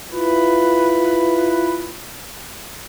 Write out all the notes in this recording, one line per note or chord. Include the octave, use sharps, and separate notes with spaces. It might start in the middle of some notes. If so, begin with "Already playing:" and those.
E4 F4 B4